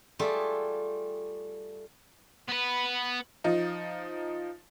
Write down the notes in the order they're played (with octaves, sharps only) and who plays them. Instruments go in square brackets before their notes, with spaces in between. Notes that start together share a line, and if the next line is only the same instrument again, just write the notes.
[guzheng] G3 A3 F4 G4 G#4 E5
[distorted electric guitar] B3 B4
[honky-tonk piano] F3 D#4